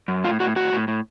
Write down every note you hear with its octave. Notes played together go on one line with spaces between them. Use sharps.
F#2
A2 F4
A2 F#4
A2 F#4
A2
A2